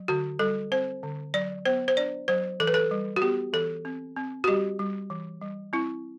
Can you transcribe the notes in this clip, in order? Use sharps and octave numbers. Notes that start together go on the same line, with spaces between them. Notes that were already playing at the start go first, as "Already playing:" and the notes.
Already playing: F#3
D3 F#4
G3 A4
C4 C5
D3
F#3 D5
B3 C5
C5
D4 D5
F#3 C5
E3 A4
B4
A4
G3
F#4
B3 G4
E3 A4
C4
C4
F#4
G3 G4
G3
E3
G3
C4 E4